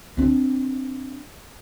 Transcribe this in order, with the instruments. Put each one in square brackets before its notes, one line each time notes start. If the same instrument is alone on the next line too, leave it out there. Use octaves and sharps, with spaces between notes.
[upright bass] C4 D4